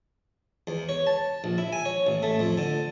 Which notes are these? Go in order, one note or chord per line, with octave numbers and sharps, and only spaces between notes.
E2
C#5
A5
A#1
E4
G#5
C#5
A1
A3
F2
D3